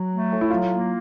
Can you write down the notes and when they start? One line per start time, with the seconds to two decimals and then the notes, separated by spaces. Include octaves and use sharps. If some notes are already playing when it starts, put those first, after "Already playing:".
Already playing: F#3 F#4
0.11 A3
0.31 A2
0.41 E4
0.50 F#3 F4
0.71 A#3